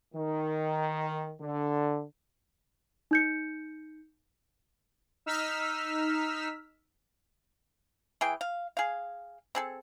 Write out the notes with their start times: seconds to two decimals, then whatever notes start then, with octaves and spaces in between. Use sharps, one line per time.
0.14 D#3
1.40 D3
3.11 D#4 G6 C#7
5.26 D#4 E6 F6 B6
8.21 E3 G#4 G5
8.41 F5
8.77 G#4 F5
9.55 C4 G#4 A4